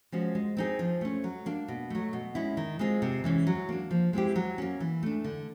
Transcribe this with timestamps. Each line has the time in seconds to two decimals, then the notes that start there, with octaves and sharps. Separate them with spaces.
0.12 F3 G#3 C#4 F#4
0.35 G#3
0.57 C4 D#4 G#4
0.79 F3
1.01 A3 C#4
1.24 F#3
1.46 A#3 D4
1.68 B2
1.90 F#3 A3
2.13 B2
2.35 G#3 C#4 E4
2.57 D#3
2.79 G#3 C4 F4 G#4
3.02 C3
3.24 E3 G#3 C#4
3.47 F#3
3.69 A#3 D4
3.91 F3
4.13 G#3 C4 E4 G4
4.36 F#3
4.58 A#3 C#4
4.80 E3
5.03 A3 D4
5.24 D3